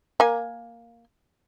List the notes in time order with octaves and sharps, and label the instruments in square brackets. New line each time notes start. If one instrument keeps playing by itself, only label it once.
[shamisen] A#3 G#5